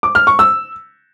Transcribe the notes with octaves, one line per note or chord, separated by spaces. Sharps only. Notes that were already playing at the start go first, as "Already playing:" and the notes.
D6
F6
C#6
E6